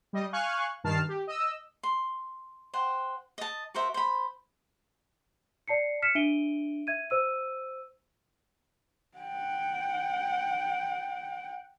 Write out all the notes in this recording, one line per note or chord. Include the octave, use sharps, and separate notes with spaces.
G3 D#5
F5 G#5 C#6 F#6
G2 D#3 A5 F6 C7
G4
D#5 E6
C6
C5 F#5 G5
D#5 A5
F#4 A#4 C5 E5
C5 B5
D5 A5 C7 C#7
F6 B6 C#7 E7
D4 E5 D7 D#7 G7
E5 G#6 D#7
C5 E6 D#7
F#5 G5